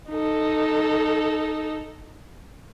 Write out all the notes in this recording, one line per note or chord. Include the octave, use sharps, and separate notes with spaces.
D#4 A4